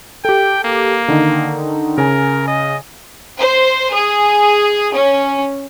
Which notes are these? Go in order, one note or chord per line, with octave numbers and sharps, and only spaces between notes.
G4 A4 G5
A#3
D3 D#3 D#4
C#3 A#4 G#5
D#5
C5
G#4
C#4